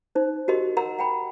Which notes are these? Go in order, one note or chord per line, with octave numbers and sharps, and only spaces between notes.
D#4 C5
F#4 G4 A#4 D#5 C6
A#4 F#5 A#5 C6 E6
F#5 G5 B5